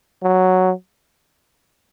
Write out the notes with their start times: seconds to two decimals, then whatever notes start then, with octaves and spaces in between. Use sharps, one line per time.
0.23 F#3